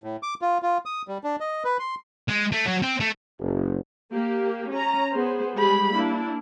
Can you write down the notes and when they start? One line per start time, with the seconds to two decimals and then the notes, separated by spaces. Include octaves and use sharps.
0.04 A2
0.23 D6
0.42 F4
0.62 F4
0.86 D#6
1.08 G3
1.24 D4
1.40 D#5
1.64 B4
1.79 C6
2.28 G#3
2.52 A3
2.66 F#3
2.82 C4
3.00 A3
3.40 F#1
4.11 A#3 G4
4.71 C#4 A#5
5.11 B3 G#4 C5
5.54 G3 G#3 G4 G#4 B5
5.92 A#3 D4 E4